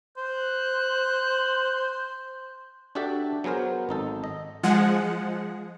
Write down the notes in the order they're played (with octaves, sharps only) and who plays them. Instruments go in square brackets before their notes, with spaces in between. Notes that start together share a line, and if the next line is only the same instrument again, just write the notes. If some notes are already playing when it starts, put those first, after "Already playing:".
[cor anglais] C5 [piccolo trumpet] F#6
[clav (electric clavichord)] D4 F#4 G4 A4 D5 E5
F#3 B3 G#4 A#4 C5
G#1 D#4 A4
D#5
[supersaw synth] F3 G#3 F#5